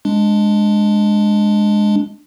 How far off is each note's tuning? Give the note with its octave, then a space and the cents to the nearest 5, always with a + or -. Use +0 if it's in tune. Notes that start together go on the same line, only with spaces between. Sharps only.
G#3 +0 D4 +0